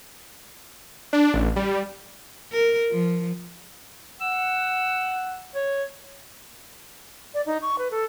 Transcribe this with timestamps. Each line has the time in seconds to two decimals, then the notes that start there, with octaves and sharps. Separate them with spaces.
1.13 D4
1.34 A1
1.56 G3
2.52 A#4
2.92 F3
4.21 F#5 E6
5.55 C#5
7.34 D5
7.46 D#4
7.62 C#6
7.78 B4
7.91 A4